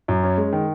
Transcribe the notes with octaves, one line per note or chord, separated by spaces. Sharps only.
F#2
C#4
G#3
D#3